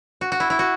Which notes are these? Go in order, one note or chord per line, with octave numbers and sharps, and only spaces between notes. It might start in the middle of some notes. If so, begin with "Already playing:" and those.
F#4
F#4
E4
E4
F#4